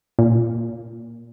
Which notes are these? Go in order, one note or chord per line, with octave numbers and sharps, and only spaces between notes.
A#2